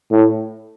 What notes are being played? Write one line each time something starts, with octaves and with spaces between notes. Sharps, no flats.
A2